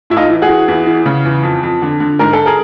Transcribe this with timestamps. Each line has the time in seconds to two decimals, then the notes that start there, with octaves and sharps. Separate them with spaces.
0.10 A2 E4
0.16 D#4 F4
0.30 E3
0.42 F#4 G#4
0.48 E3
0.68 E2
0.87 E3
1.06 C#3
1.25 E2
1.43 F2
1.63 F2
1.82 D3
2.00 D3
2.19 G#2 A#4
2.33 A4
2.46 G#4 A#4